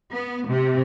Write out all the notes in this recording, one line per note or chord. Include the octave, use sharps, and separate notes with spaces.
B3
C3